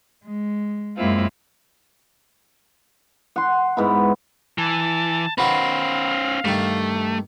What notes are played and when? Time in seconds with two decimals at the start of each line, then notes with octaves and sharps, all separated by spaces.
0.24 G#3
0.96 F#2 G#3 A#3 C4 E4 F4
3.36 F#5 C6
3.77 G#2 B3 E4
4.58 E3 A5
5.38 D#3 C#4 F#4 B4 C5 F5
6.45 G2 D#3 A3